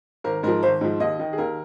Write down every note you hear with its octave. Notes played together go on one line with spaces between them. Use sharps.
G#1 A#4
G#2 F3 A#4
G#1 C5
G#2 F3
D#2 D#5
D#3
G#4
D#2 A#4